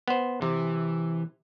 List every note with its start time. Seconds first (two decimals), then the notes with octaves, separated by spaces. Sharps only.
0.08 B3 C5
0.42 C3 E3